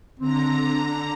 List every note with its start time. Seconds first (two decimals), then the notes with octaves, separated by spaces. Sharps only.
0.19 D3 C4 A#5